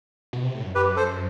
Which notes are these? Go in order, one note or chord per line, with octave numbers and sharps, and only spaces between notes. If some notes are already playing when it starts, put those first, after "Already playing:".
B2
C3
A2
F#2
F#2 G4 B4
A4 C5